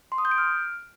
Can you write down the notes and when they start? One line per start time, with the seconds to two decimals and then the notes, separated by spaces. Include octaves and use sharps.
0.12 C6
0.18 D#6
0.25 G6
0.31 D7
0.38 F6